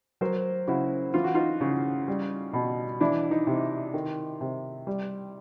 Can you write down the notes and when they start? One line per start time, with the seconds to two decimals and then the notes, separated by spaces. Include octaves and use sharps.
0.21 F#3 A#4 C5
0.67 C#3 E4 F#4
1.14 E3 F4
1.24 F#4
1.34 D#4 F4
1.61 C#3
2.08 G3
2.53 B2
3.01 E3 D4 E4
3.31 D#4
3.47 C3
3.94 D#3
4.41 C3
4.87 G3